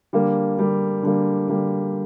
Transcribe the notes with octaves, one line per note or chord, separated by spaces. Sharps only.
D3 G3 A#3
D3 G3 A#3
D3 G3 A#3
D3 G3 A#3